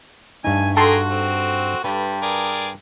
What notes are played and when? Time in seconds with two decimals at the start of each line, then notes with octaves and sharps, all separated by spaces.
0.44 G2 A3 D#4 G#5
0.77 F#4 G#4 A4 G5 A#5 C6
1.10 C4
1.84 G2 G3 B4
2.22 G#4 A#4 D5